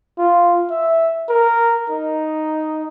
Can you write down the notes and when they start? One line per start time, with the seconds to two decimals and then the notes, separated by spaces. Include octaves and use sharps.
0.18 F4
0.70 E5
1.29 A#4
1.90 D#4